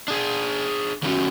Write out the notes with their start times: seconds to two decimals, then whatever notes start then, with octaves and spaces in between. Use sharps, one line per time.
0.08 D4 G#4
1.03 D#3 F#3 G3 A3 C#4 F#4